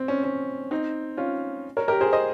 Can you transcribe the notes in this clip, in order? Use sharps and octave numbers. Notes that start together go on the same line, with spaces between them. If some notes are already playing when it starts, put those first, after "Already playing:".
Already playing: C4
C#4
C#4
C4 D#4
C#4 F4
A#4 C#5
G4 A#4
G#4 C5
C5 D#5